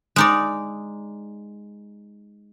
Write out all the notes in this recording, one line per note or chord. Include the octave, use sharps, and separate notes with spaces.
G#3 D#4 D5